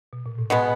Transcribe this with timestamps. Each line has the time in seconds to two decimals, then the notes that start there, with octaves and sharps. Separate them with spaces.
0.13 B2
0.26 A#2
0.38 A2
0.50 B2 G#3 B3